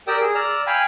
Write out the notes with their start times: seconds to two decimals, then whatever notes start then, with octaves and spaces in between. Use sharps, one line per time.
0.07 G4 A#4 D5 G5 D#6 E6
0.20 G#4
0.35 D5 A#5 E6 F6
0.67 F5 G5 G#5 B5